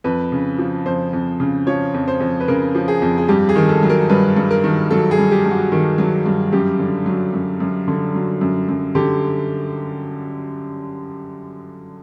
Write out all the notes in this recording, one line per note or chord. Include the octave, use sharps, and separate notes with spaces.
F2 B4
C#3
F3
F2 C5
F2
C#3
F3 C#5
F2
C5
F2
B4
C#3 A#4
F3
G#4
F2
G#4
G2 G4
G#4
D#3
A4
F#3
A#4
G2 B4
G2
A#4
D#3
F#3 A4
G#4
G2
G4
G2
F#4
D#3
F#3
G2
F#2 G4
D3
F#3
F#2
F#2
D3
F#3
F#2
F#2
D3 G4